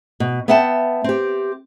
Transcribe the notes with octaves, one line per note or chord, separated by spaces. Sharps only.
B2
B3 E5 F#5 G5 A5
C4 G4